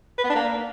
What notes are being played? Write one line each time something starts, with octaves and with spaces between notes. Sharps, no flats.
B4
B3
D4
A#3